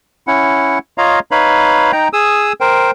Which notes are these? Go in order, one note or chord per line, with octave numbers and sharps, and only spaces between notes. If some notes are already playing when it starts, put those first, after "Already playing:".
C#4 E4 F#5
F4 C#5 D#5 F5 A#5
D#4 B4 C#5 F5 B5
D#4 G5 A#5
G#4 D#6 E6
A#4 C5 G5